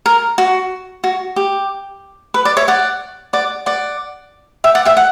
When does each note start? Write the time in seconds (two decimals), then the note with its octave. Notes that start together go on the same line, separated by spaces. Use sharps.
0.06 A#4
0.38 F#4
1.04 F#4
1.36 G4
2.34 B4
2.45 D5
2.57 C#5 E5
2.68 D5 F#5
3.33 D5 F#5
3.66 D5 F#5
4.64 E5 G5
4.75 D5 F#5
4.85 E5 G5
4.97 F#5